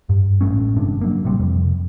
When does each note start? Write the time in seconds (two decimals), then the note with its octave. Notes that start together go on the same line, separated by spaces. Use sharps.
0.09 G2
0.41 A1 G#3 A3 C#4
0.76 G1 C3 D4
1.01 F#3 A#3
1.25 A1 C3 G3 C4
1.39 F2 C3